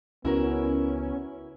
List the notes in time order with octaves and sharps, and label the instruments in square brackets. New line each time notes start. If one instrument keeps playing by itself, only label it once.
[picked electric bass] C#2 [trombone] B3 [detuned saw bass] C#4 [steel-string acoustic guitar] E4 F#4 A#4